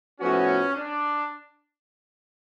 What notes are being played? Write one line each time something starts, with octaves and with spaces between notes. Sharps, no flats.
A2 F3 B3 C#4 F#4
D4